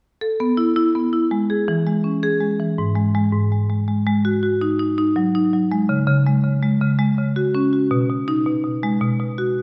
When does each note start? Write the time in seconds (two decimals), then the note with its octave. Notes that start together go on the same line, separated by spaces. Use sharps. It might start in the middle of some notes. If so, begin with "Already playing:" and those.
0.21 A4
0.40 B3
0.57 E4
0.76 E4
0.95 B3
1.13 E4
1.31 G#3
1.50 G#4
1.68 E3
1.86 G#3
2.04 C#4
2.23 G#4
2.41 G#3
2.59 E3
2.78 G#2
2.96 G#3
3.15 G#3
3.32 G#2
3.52 G#3
3.70 G#3
3.88 G#3
4.07 G#3
4.25 F#4
4.43 F#4
4.61 D#4
4.79 D#4
4.98 D#4
5.16 F#3
5.35 D#4
5.53 F#3
5.72 G#3
5.89 C#3
6.07 C#3
6.26 G#3
6.44 C#3
6.63 G#3
6.81 C#3
6.99 G#3
7.18 C#3
7.36 F#4
7.55 C#4
7.73 F#4
7.91 B2
8.10 B2
8.28 D#4
8.46 B2
8.64 B2
8.83 G#3
9.01 B2
9.20 B2
9.38 F#4